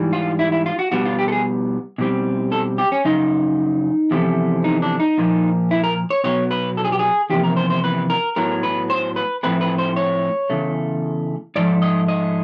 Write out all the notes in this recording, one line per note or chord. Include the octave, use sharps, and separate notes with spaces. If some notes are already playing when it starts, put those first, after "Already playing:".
Already playing: G#2 E3 G3
F4
E4
E4
F4
F#4
B2 G3 B3 F#4
F4
G4
A4
G#4
B2 G3 C4
A4
G4
C#4
F#2 C#3 D#4
E2 C3 F3 A3
D#4
D4
D#4
A#2 F3 A#3
E4
A#4
C#5
B2 F#3 B3 C#5
B4
A4
G#4
G4
G#4
E2 C3 F3 A#3 G4
A#4
C5
C5
B4
A#4
A2 F#3 B3 A#4
B4
C5
B4
A2 F3 A3 C4 B4
B4
C5
C#5
E2 C#3 A3
G#2 F3 A3 D5
D#5
D#5